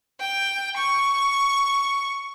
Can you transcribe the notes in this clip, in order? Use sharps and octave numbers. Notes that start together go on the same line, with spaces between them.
G5
C#6